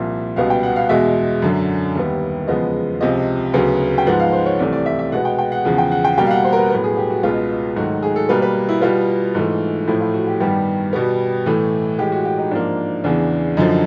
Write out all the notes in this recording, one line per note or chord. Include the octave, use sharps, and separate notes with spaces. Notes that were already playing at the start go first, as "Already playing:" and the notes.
Already playing: C2 A#2 F3 E5
C#2 B2 G3 B3 F5
G5
F#5
F5
E2 B2 G#3 E5
F#2 D3 F#3
D#2 D#3 G3 B3
E2 C#3 F3 G#3 B3 D#5
C#2 C3 F3 D#5
D2 C#3 F#3 B3
G5
G#2 F3 G#3 B3 F#5
F5
C5
C#5
C2 C3 E3 A3 D5
D5
E5
E5
B2 G#3 B3 F#5
G5
G5
F#5
E2 C#3 F3 F#5
G5
F#5
G5
B2 G3 A#3 G5
F5
F#5
C5
A#4
B4
A2 F#3 B3
G#4
G4
F#4
C#2 B2 G#3 B3 F4
G#2 D#3 F#3 A3 F#4
G#4
A4
B2 G3 A#3 B4
B4
E4
B2 G3 B3 F4
G#2 E3 A3
A2 F3 A3 E4
F4
F#4
G4
G2 D#3 G3 B3 G4
B2 G3 B3
A2 E3 A3
A2 E3 G#3 G4
F#4
G4
D#4
G#2 F3 A#3 D4
E2 C#3 E3 D4
F#2 D3 F3 D#4